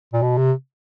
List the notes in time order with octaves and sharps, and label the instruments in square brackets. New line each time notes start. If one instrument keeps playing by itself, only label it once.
[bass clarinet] A#2
B2
C3